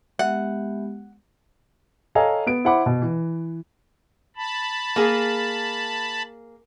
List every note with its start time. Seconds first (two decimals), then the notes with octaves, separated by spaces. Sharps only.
0.19 G#3 B3 G4 E5 F#5
2.15 A4 C#5 D#5 F5 G#5 A#5
2.47 B3 D7
2.65 E4 C5 F#5 B5 D6
2.86 B2
3.02 E3
4.36 A5 B5
4.96 A#3 G#4